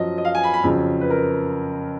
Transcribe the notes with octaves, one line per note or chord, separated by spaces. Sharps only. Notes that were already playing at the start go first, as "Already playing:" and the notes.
Already playing: F#2 F3 D#5
D#5
F5
G#5
B5
B5
F2 C#3 F#3
B4
A#4